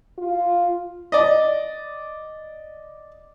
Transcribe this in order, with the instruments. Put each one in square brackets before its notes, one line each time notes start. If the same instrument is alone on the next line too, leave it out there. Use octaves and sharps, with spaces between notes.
[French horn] F4
[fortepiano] D5 D#5